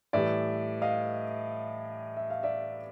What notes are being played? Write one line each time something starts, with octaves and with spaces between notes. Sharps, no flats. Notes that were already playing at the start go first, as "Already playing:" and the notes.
A2 E3 G3 D5 E5
D#5 F5
E5
F5
D5 E5